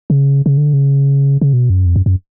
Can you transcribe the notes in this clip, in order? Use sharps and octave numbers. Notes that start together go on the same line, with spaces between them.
C#3
C#3
D3
C#3
C#3
B2
F#2
F2
F#2
F#2